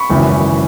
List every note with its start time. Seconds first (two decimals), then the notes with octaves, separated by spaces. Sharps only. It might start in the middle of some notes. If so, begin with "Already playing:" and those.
Already playing: B5 C#6
0.10 G#1 F#2 C#3 E3